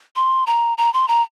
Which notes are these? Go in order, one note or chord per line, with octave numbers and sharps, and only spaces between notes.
C6
A#5
A#5
C6
A#5